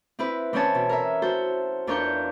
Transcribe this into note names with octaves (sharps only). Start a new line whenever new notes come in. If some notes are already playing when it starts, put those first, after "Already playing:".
C4 E4 B4
E3 C4 C#4 C#5 A5
B2
A#4 E5
F#4 A4 C5
E2 D4 F4 A#4 C#6 G6